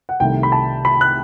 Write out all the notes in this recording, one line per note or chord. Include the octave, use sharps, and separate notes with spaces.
F#5
C2 C3 D#3 A3 G5
B5
A5
B5
F#6